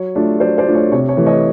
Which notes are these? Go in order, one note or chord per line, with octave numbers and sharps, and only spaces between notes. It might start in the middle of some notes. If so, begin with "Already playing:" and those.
Already playing: F#3 C#5
A3 D4 F4
F#3 C5 D5
C5 D5
A3 D4 F4
C#5
C3 C#5
C#5
E3 A3
C#5 D#5